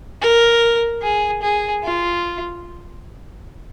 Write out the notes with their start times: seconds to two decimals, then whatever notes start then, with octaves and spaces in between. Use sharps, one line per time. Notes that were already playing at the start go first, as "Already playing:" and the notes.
0.22 A#4
1.02 G#4
1.43 G#4
1.84 F4